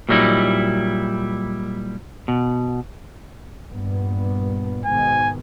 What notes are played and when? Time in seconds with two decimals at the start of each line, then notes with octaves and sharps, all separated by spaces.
0.09 A#2 F#3 G3 D#4 E4
2.28 B2
3.70 G2 A#2 B3
4.86 G#2 B2 D#3 G#5